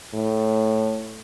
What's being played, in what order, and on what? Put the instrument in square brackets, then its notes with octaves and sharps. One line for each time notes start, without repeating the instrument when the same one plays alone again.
[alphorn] A2